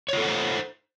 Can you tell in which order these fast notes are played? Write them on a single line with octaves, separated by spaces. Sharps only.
C#5 F4 A4 F#5 C5